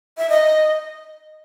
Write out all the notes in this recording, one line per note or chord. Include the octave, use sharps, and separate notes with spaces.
E5
D#5